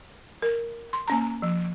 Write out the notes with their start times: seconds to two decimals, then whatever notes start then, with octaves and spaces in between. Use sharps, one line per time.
0.42 A#4
0.93 C6
1.07 A#3 C#4 A#5
1.42 F3